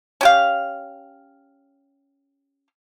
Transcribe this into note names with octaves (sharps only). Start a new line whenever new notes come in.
C#4 G4 F5